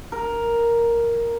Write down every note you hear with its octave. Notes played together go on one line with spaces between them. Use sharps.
A#4